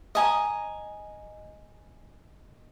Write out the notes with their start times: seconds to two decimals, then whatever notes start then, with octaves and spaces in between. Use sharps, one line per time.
0.15 D#5 G#5 A#5